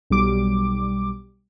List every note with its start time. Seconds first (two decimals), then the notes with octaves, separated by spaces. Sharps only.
0.10 B1 G3 D6